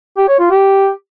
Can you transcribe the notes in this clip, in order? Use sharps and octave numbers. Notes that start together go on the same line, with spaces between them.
G4
C#5
F4
G4